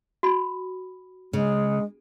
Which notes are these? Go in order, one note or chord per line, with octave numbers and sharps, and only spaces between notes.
F#4 B5
C#3 G#3